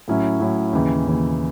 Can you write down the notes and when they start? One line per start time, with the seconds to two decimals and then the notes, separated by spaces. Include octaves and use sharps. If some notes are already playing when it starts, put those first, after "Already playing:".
0.08 A2 F#3 C#4 E4
0.40 A2 F#3 C#4 E4
0.73 D#2 C#3 E3
1.06 D#2 C#3 E3